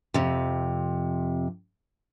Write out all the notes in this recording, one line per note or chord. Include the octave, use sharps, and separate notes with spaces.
F2 C3